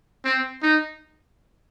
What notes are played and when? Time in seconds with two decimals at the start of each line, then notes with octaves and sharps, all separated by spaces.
0.25 C4
0.63 D#4